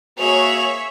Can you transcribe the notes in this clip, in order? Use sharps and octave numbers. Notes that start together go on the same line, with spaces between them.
A#3 F#4 G#4 C#5 E5 F7